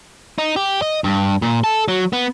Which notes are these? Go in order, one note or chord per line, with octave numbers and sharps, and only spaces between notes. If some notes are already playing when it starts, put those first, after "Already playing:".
D#4
G4
D#5
G2
A#2
A4
F#3
B3